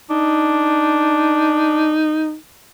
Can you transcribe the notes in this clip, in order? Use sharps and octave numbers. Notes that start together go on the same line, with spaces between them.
D4 D#4